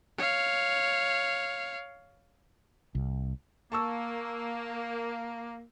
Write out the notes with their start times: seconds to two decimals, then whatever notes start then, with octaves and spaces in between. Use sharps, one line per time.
0.18 C#5 F5
2.95 C2
3.72 A#3 A5 C#6 E6